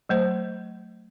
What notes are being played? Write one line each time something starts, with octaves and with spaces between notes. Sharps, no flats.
F#3 A3 C5